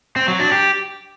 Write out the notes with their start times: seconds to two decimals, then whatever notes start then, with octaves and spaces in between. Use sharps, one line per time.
0.16 C4
0.28 F#3
0.40 D4
0.51 G4